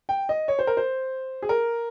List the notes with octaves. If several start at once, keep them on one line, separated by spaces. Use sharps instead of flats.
G5
D#5
C#5
C5
A#4
C5
G#4
A#4